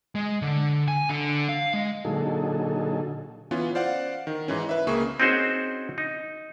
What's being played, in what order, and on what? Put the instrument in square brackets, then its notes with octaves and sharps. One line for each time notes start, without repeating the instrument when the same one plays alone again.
[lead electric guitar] G#3
D3
G#5
D3
F5
G#3
[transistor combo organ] A#2 D3 F#3 D#4 G#4 A4
[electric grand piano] E3 B3 C#4 F4
C5 D5 F5 F#5
D#3
G#2 E3 C#4
B4 E5
C#2 C#3 A#3 G#4 C#6
[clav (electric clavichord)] C4 C#4 D#4 F#4 G#4 C5
D#4